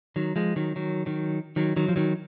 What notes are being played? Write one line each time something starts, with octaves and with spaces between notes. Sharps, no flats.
D#3 F#3
F3 G#3
D#3 F#3
D#3 F#3
D#3 F#3
D#3 F#3
D#3 F#3
F3
D#3 F#3